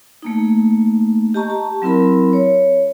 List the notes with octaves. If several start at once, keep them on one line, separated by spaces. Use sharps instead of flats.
A3 A#3 D#4
G4 D#5 A5 A#5 C#6
A5
F#3 C4 E4 A#4 B5
C#5